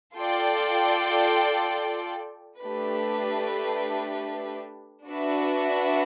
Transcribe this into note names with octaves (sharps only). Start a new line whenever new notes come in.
F4 A4 D5 G5
A3 D4 G4 B4
D4 F#4 B4 E5